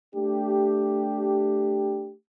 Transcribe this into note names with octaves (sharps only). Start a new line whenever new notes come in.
A3 D4 G4